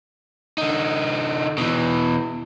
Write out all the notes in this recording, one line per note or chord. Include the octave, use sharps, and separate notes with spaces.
D3 D#4
B2 E3